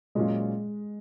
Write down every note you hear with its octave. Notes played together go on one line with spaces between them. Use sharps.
A#2 F#3 G#3 C#4 F4